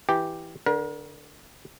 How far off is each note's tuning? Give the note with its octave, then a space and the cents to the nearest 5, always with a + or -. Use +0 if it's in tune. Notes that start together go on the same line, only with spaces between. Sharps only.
E3 +0 G4 +0
D3 +0 A#4 +40